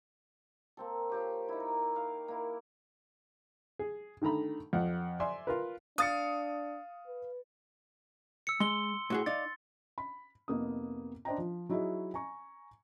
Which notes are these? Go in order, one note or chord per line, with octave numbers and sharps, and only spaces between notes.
A#3 C4 A4
F3 G4 C#5
D#4 E4
A#4
F5
A#3 E4
G#4
D3 D#3 A3 A#5 B5
F2 F#5
D5 E5 G#5 C6
F4 A#4 B4
D4 F5 D#6 A6 C#7
B4
E6 C#7
G#3 C6 G7
A2 F#4 G#4
D#4 D5 F5 A6
B5
F2 C3 A#3 B3 D#4 D#6
D4 C5 D#5 G5 A#5
F3
F#3 D#4 E4 F#4 G#4 E5
G#5 A#5 C#6